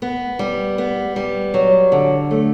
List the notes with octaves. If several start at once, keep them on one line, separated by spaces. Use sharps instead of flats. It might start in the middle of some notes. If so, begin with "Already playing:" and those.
B3
G3
B3
G3
F#3
D3
A3